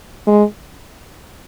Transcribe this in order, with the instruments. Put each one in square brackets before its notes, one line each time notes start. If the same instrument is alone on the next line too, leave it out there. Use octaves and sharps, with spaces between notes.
[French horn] G#3